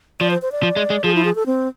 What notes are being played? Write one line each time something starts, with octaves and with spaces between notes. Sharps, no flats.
F3 D5
C5
C5
D5
F3
G#3
G#3
F3 G#4
E4
G#4
A4
C4